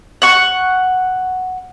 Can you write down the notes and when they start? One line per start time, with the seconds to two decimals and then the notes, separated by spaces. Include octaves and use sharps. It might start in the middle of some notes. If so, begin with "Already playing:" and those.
0.22 F#5 C#6